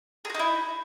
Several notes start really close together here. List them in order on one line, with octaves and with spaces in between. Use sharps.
G#4 F#4 D#4 E4